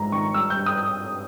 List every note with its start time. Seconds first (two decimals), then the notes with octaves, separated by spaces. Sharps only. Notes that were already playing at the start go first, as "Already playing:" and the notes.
Already playing: A#1 G#2 A#5
0.12 D#3 C#6
0.34 G3 E6
0.50 G6
0.56 G2
0.66 D#6